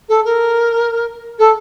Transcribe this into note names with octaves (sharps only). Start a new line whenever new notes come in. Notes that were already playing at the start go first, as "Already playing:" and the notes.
A4
A#4
A4